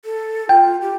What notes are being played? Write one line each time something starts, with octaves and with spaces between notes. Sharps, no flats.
A4
F4 G5
G4